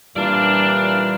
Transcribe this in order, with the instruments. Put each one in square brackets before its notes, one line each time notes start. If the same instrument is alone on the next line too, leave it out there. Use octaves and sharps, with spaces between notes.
[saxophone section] A#2 E3 [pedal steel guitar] G3 [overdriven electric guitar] D4 D5 [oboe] F5